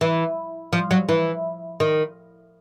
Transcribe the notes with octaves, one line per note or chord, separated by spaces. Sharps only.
E3
F3
F#3
E3
D#3